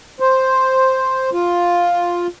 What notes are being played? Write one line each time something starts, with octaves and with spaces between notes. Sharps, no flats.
C5
F4